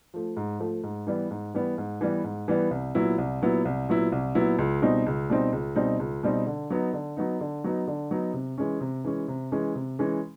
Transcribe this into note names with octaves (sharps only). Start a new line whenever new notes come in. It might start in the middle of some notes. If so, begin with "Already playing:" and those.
F3 A3
G#2
F3 A3
G#2
E3 G3 B3
G#2
E3 G3 B3
G#2
E3 G3 B3
G#2
E3 G3 B3
C2
A#2 F#3 B3 E4
C2
A#2 F#3 B3 E4
C2
A#2 F#3 B3 E4
C2
A#2 F#3 B3 E4
C#2
B2 G3 C4 D#4
C#2
B2 G3 C4 D#4
C#2
B2 G3 C4 D#4
C#2
B2 G3 C4 D#4
D3
F#3 B3 D#4
D3
F#3 B3 D#4
D3
F#3 B3 D#4
D3
F#3 B3 D#4
C3
E3 G#3 C#4
C3
E3 G#3 C#4
C3
E3 G#3 C#4
C3
E3 G#3 C#4